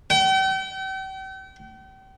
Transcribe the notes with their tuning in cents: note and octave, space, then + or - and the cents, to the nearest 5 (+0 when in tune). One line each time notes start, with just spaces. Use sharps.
G5 -40